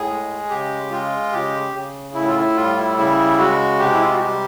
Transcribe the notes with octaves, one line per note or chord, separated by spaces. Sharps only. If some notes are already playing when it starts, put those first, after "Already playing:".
Already playing: A2 G#4
G#3
C#3 G4
G#3 F4
C#3 G4
C#3
A2 E4
F4
E4
G3 F4
E4
C#3 E4
G#3 F#4
C3 G4
E4
F4
F#4
G3 G4